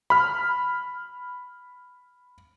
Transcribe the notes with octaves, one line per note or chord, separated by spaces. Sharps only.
B5 F6